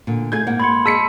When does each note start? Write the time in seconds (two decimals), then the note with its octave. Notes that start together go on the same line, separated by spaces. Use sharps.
0.07 A#2 D3
0.32 A3 F4 G#4 G6 G#6
0.47 G#2 A#3 F#5
0.60 B5 C6 G#6 C#7
0.85 G#3 A5 E6 B6 C#7 D#7